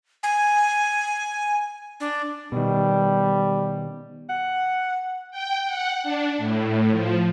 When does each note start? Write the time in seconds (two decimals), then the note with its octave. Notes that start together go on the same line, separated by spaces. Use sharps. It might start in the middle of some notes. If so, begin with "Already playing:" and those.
0.23 G#5
2.00 D4
2.52 B2 D#3 G3
4.29 F#5
5.31 G5
5.66 F#5
6.03 D4
6.38 A2
6.91 F3